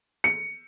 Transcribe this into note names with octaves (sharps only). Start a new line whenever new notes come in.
C#7